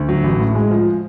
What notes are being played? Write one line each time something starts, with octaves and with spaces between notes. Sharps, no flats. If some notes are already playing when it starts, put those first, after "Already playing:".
Already playing: D2
F#3
A1
A2
G#3
F3